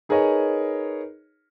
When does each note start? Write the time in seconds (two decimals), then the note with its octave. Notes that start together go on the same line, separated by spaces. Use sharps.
0.09 D#4 G#4 A#4 B4 C#5 D#5